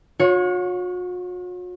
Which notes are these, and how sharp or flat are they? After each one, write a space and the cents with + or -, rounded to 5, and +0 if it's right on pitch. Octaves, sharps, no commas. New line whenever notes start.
F#4 -45 C#5 +0